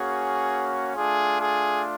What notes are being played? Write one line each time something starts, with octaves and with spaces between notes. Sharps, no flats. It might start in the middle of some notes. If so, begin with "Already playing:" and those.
Already playing: A#3 C#4 F#4 G#4
A3 D4 F4 G#4
G#4